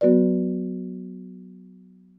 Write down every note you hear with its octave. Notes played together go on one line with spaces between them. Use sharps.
F#3 B3 F#4 B4 D5